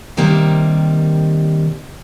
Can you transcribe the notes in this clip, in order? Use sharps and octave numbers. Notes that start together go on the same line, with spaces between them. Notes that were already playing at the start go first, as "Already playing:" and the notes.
C3 D#3 G3 A#3